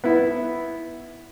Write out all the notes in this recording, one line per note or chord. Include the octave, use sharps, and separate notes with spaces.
B3 E4